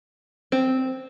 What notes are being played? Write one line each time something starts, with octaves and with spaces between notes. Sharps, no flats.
C4